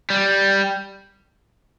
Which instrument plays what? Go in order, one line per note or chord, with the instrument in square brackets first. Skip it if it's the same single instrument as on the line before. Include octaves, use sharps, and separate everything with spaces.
[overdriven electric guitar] G3